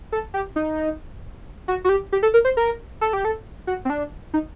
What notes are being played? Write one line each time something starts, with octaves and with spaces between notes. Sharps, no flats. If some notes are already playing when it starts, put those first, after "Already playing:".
A4
G4
D#4
F#4
F#4
G4
G4
A4
A#4
C5
A#4
A4
G4
A4
F#4
C4
D4
D#4